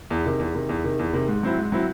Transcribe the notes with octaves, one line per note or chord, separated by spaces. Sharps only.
E2
C3 D#3
E2
C3 D#3
E2
C3 D#3
E2
C3 D#3
G#2
F#3 C4 E4
G#2
F#3 C4 E4